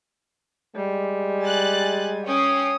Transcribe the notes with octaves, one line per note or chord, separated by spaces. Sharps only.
G3 G#3
G#5 F#6 A6
C#4 C#5 G5 D#6 C7